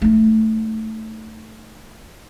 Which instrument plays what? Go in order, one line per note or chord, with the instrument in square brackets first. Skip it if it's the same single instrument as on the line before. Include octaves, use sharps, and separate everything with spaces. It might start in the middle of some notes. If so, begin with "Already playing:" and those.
[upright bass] A3 D#4